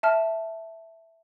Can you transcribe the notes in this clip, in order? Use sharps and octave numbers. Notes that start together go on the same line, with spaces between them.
E5 A5 F6